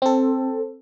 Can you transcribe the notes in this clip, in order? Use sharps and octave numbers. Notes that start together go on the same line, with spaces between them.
C4 A4